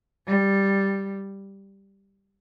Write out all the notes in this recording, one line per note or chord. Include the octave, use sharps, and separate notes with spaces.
G3